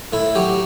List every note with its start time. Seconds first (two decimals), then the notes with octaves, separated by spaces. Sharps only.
0.13 A2 E4
0.35 F#3 G4